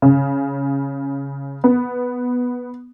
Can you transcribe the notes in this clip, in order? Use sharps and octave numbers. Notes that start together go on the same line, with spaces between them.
C#3
B3